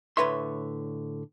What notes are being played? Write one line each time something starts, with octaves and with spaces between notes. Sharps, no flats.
A2 D3 B4 C#5 E5 C6